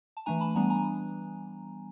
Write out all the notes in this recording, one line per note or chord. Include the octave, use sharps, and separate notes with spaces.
A5
E3 A3 D4 G#5 A#5
A5 B5
E3 G3 B3 D4 G#5 A#5
G#5 A#5